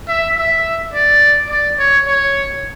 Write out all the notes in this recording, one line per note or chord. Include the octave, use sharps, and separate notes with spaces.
E5
E5
D5
D5
C#5
C#5